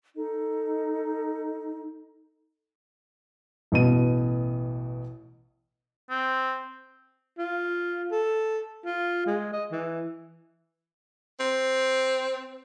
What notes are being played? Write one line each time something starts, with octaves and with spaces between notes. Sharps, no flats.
D#4 A4 D#5
A1 B2 D#7
C4
F4
A4
F4
G#3
D#5
E3
C4